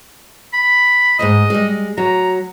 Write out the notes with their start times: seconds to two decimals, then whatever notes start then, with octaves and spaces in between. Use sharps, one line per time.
0.54 B5
1.19 D2 G#2 D#5
1.50 G3 G#3
1.98 F#3 A#5